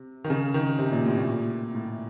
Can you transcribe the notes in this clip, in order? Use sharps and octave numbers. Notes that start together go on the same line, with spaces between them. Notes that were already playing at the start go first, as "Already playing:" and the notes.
Already playing: C3
D#3
C#3
D#3
C3
A#2
A2
A#2
A2